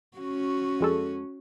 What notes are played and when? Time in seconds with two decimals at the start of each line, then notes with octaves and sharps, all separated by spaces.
0.17 C#4 F#4
0.80 F2 G#3 A4